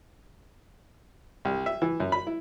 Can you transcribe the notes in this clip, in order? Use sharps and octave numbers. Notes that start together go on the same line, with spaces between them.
C2
E5
E3
F#2
B5
E4